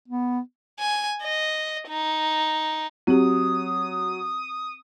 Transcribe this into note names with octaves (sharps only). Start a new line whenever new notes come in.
B3
G#5
D#5
D#4
F#3 C4 G4 D#6